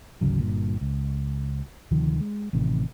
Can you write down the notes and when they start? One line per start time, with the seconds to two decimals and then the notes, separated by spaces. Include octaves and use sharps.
0.21 G#1 D2 C#3 F#3
0.39 G1 G2 A#2
0.81 C#2
1.91 D2 C3 D#3 F3
2.20 G#3
2.53 A1 C3 D#3